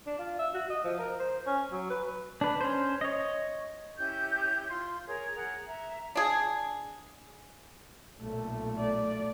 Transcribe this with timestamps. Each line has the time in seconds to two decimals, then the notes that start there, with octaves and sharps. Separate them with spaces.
0.07 D4
0.18 F4
0.39 E5
0.54 F#4
0.70 D#5
0.84 F3
0.99 A#4
1.20 C5
1.46 C#4
1.72 F#3
1.90 B4
2.41 D4 B4
2.61 C#4 C5
3.01 C#5 D#5
3.98 C#4 E4 G4 G6
4.69 F4 C6
5.06 G#4 A#4 C#5
5.35 G#4 A#4 F#5
5.65 E5 A#5
6.15 D4 G#4
8.17 B1 A#2 A3
8.78 D5